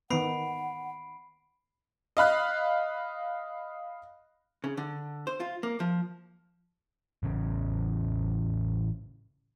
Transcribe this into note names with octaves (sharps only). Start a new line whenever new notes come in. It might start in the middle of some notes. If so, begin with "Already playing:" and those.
D#3 B3 F#5 B5 C7 D7
D#5 F5 B5 F#6
C#3
D3
C5
F4
A#3
F3
A1 C#3